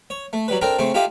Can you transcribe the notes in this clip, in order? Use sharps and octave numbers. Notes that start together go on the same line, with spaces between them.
C#5
A3
F#3 G3 B4
C4 D4 A4 A#4 G5 A#5
C#3 A3 C4 C5
E4 F4 G4 A4 D#5 F5